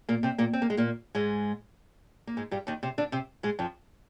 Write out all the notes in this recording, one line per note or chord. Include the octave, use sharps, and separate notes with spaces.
A#2 A#3
C3 C4
A#2 A#3
C4
A#3
G#3
A#2 A#3
G#2 G#3
A#3
G#2 G#3
G2 G3
D#2 D#3
C3 C4
D3 D4
C3 C4
G#2 G#3
F2 F3